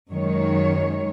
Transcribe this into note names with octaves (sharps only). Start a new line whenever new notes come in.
F#2 D#3 G#3 C#5